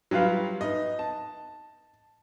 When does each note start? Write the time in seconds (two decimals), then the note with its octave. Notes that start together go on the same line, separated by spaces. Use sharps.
0.11 F#3 G3 F4 B4 F5
0.61 D#4 B4 D#5
0.99 A5